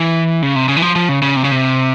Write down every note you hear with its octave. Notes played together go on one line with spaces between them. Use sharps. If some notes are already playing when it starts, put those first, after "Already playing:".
Already playing: E3
C#3
C3
C#3
E3
F3
F3
C#3
C#3
C3
C#3
C3